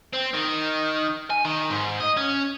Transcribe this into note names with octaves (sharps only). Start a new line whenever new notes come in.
C4
D#3
G#5
D#3
G#2
D#5
C#4